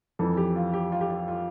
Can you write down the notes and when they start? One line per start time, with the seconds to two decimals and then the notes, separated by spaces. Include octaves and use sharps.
0.19 F2 E3 A4
0.37 G4
0.56 F4
0.73 G4
0.92 F4
1.01 G4
1.10 F4
1.28 F4